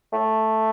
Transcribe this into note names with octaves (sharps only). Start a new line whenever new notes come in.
A3